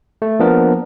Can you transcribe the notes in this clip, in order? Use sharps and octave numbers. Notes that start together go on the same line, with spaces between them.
A3
F3 A#3 B3 D4 A#4